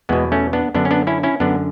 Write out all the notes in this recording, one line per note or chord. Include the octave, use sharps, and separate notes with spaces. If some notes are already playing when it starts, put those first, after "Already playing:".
E2 B2 G#3 B3
A3 C#4
B3 D4
F#2 D3 B3 D4
C#4
B3 D4
C#4 E4
C#4 E4
F#2 D3 B3 D4